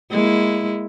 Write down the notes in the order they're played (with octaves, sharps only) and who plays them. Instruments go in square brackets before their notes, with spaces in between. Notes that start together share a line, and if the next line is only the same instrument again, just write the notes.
[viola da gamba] G#3 A#3 E4